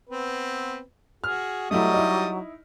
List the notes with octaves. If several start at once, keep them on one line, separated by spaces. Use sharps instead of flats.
B3 C4 B4
F#4 G#4 F6
F#3 G3 A3 E4 D#5 D#6
D#4 E4